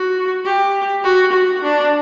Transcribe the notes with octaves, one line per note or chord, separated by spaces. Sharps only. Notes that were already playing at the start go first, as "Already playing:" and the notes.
Already playing: F#4
G4
F#4
F#4
D4